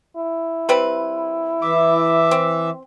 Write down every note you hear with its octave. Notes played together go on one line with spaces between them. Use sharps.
E4
G3 C4 B4
E3 E5 D6
C4